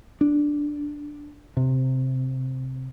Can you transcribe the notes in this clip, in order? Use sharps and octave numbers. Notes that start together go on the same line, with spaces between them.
D4
C3